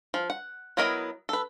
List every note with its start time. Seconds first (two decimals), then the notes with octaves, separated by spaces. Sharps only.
0.14 F3
0.30 F#5
0.77 F#3 B3 E4 A#4 D#5
1.29 A4 B4